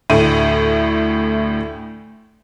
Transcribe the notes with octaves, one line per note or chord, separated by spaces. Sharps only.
D2 A2 D#7